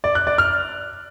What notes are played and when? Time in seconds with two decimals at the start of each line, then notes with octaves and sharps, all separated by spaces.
0.04 D5
0.15 F#6
0.27 D5
0.38 F6